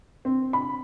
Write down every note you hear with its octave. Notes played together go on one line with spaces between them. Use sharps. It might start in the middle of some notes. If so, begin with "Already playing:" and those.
C4
B5